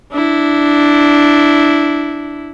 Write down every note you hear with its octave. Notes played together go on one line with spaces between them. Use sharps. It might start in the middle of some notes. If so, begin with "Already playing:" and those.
D4 E4